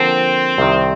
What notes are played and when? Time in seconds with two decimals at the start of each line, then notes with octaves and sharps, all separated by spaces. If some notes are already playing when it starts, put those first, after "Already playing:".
Already playing: D3 F3 A#3 C4
0.58 C2 C3 D#3